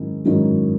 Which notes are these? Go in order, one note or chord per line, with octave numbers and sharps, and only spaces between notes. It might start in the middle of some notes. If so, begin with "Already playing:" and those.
Already playing: G#2 D#3 F#3 C#4 E4
G#2 D#3 F#3 C#4 E4